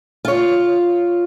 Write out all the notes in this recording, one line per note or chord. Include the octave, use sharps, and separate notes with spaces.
F4 C#5